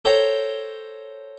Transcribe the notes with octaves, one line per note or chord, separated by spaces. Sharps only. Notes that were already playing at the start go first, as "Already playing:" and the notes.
A4 C5 C#5 G5 A#5